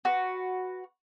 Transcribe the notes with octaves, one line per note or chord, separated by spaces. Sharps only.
F#4 B4